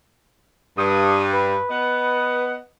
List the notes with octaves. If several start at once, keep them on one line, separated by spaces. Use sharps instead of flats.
G2 D#6
B4
B3 D#5 F#5